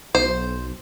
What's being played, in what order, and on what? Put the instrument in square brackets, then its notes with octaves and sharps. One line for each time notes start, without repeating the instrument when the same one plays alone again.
[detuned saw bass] B1 [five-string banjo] C5